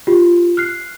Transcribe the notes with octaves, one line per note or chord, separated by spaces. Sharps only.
F4 G4
F6 F#6 C7